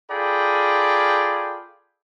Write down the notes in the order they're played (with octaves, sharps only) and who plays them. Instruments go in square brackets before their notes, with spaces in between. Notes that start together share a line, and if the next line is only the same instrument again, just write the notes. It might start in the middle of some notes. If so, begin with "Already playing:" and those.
[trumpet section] F4 G#4 A4 D5 G5 B5